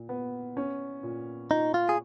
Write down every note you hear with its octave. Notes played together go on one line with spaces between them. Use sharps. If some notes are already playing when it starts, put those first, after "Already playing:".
Already playing: A#2
B3
C#4
A#2
A#2 D#4
F4
G#4